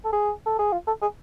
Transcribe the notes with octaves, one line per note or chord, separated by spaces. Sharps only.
A4
G#4
A4
G#4
F4
A4
G#4